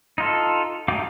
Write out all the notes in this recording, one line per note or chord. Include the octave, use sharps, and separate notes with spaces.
D#4 F4 A4
A3 D#4 G4 F5 D6